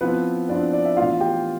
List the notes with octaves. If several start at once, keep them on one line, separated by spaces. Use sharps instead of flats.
F3 B3 C4 E4 B4
F3 C4 D4 E4 D5
D5
E5
A2 E3 B3 F4 F5
G4 G5